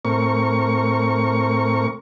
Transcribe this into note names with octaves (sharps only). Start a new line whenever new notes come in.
A2 C4 A#4 C#6